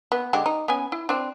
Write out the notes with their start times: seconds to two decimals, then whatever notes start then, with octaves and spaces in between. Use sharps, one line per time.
0.12 B3
0.33 D3 G#3 G4
0.46 D#4
0.68 B3 C#4 G#5
0.92 E4
1.09 C4 D4